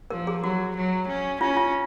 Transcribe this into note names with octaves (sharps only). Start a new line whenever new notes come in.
F3 A#4
G#4
F#3 F#4
F#3
C#4
C#4 F4
F4